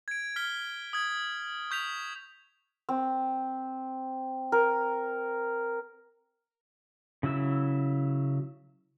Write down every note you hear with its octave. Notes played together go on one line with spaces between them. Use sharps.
G#6 D7
F6 B6 G7
D#6 G#6
C#6 G6 B6 F7
C4
A#4
C#3 F#3 E4 E5 E6